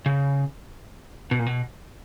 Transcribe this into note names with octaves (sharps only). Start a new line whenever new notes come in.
C#3
B2
A#2
B2